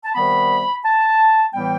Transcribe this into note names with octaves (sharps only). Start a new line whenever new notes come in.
A5
C3 D#3 G3 B3 B5
A5
A2 E3 G3 B3 G5